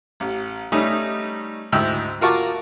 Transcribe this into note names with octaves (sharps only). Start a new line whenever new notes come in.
A1
G3 A3 C#4 D#4
D2 G#2 E4 G5 E6
F4 F#4 A#4 A5 C#6 D6